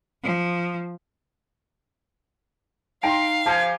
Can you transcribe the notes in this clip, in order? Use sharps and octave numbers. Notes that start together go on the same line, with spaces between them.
F3
D#4 F5 G5 A#5 C6 D7
F3 G4 G#5 A5